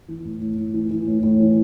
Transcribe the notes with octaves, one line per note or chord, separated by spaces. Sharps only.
E3
A2
A2
A2
E3
E3
A2
A2
E3